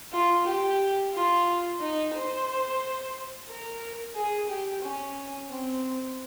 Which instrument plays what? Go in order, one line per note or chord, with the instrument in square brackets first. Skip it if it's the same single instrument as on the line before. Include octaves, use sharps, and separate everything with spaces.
[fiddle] F4
G4
F4
D#4
C5
A#4
G#4
G4
C#4
C4